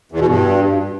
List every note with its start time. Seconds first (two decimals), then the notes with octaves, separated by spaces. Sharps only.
0.12 E2
0.20 B2
0.28 G2